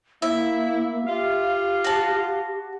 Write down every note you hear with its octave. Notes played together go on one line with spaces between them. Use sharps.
A#3 E4 E5
F4 G4 F5
F#4 A5